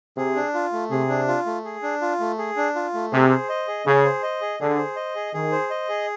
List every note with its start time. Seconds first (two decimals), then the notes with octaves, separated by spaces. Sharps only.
0.17 C3 G#4
0.36 D4
0.54 F4
0.72 A3
0.90 C3 G#4
1.09 D4
1.28 F4
1.46 A3
1.65 G#4
1.83 D4
2.02 F4
2.20 A3
2.39 G#4
2.57 D4
2.75 F4
2.94 A3
3.12 C3 G#4
3.31 C5
3.49 D#5
3.68 G#4
3.86 C#3 G#4
4.05 C5
4.23 D#5
4.41 G#4
4.59 D3 G#4
4.78 C5
4.96 D#5
5.15 G#4
5.34 D#3 G#4
5.52 C5
5.70 D#5
5.89 G#4